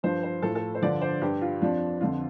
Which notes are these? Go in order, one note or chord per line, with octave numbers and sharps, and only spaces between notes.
G2 F3 C5
C5
A2 F3 A4
A4
C5
G2 D3 F3 D5
C5
G2 G3 G4
F4
F2 F3 D4
F2 D3 F3 F4